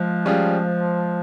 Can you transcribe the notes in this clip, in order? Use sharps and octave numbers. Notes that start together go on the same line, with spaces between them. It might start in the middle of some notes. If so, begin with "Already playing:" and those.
Already playing: F3 G#3
G3 C#4 F4 G#4